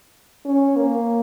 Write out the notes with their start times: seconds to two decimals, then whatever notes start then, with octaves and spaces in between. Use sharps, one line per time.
0.45 C#4
0.76 A#3